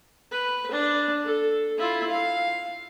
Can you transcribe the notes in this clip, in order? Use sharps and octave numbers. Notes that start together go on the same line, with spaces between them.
B4
D4
A4
E4 F4
F5